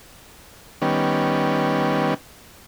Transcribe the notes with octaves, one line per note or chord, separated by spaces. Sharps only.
D#3 G3 B3 C#4